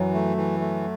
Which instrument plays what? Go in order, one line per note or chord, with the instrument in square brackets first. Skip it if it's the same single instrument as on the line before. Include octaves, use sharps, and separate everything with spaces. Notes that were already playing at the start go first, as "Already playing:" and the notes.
Already playing: [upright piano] F#2 F#3 [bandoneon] E3
[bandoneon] A3
E3
A3